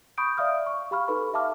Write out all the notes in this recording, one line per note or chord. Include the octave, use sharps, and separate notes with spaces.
B5 C#6 D#6 G6 D7
D5 E5 F5 D#6 F6
C#6
G4 F5 B5 C#6 F6
D#4 G4 A4 B4 B5 C#6
E5 F5 A5 D6 F6